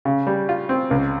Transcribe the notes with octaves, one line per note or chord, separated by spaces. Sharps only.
C#3
G3
F4
C4
C#2